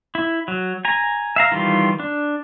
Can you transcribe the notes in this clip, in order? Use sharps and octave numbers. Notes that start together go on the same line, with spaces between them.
E4
F#3
G#5 A#5
E5 F5 A#5
D#3 E3 G3 F4
D4